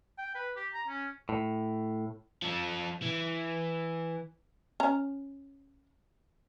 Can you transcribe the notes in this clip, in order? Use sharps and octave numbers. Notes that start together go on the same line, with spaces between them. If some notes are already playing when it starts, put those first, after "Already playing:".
G5
B4
G4
A#5
C#4
A2
F3 A4
E3
C#4 A#5